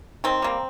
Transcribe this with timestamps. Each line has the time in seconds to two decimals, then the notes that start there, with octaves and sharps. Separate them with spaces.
0.24 D#3 C4
0.42 G3 A#3